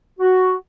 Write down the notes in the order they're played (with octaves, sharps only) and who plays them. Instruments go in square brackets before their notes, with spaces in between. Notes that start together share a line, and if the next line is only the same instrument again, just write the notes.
[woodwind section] F#4